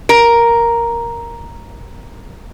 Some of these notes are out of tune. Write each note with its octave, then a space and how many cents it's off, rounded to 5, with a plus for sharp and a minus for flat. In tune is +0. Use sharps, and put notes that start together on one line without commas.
A#4 +0